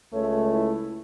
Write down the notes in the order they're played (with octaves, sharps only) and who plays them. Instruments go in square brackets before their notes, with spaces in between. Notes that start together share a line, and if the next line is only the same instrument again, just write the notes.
[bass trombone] C#2 [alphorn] A3 [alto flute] C#5
[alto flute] E4